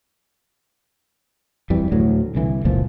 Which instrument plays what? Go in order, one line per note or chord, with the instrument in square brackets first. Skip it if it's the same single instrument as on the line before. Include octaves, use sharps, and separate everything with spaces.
[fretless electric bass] F2 E3 G3
D2 A2 F#3
C2 D3 E3
F#1 C#2 A#2 F3